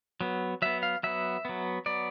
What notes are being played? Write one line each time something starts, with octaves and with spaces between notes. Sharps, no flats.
F#3 B3
F#3 B3 E5
F5
F#3 B3 E5
F#3 B3
F#3 B3 D5